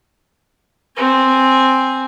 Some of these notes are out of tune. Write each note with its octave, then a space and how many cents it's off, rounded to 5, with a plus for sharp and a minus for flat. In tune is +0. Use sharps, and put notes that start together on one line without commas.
C4 +0 G#5 +0